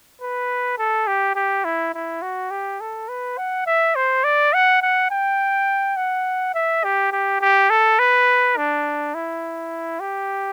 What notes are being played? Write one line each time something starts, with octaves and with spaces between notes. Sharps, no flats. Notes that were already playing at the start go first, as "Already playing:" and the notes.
B4
A4
G4
G4
E4
E4
F#4
G4
A4
B4
F#5
E5
C5
D5
F#5
F#5
G5
F#5
E5
G4
G4
G4
A4
B4
D4
E4
G4